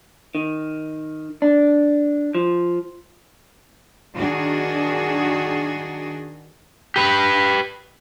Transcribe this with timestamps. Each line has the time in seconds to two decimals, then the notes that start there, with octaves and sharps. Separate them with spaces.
0.35 D#3
1.42 D4
2.35 F3
4.17 D#3 D4 F#4 G#4
6.96 G4 B4